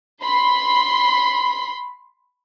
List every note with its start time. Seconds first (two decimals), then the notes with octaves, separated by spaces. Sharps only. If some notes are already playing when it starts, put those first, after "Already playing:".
0.22 B5 C6